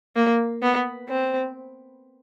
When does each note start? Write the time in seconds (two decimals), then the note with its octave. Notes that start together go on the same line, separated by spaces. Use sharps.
0.16 A#3
0.62 B3
1.09 C4